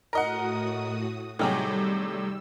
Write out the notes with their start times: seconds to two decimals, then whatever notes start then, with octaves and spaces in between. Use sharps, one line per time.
0.13 A2 F#4 A#4 D#5 F#5 D#6
1.39 A2 C3 D#3 F#3 G3 G#4 E6